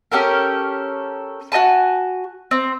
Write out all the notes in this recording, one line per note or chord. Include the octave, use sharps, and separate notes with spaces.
C#4 G4 A4 A#4
F#4 D#5 G#5 A5
C4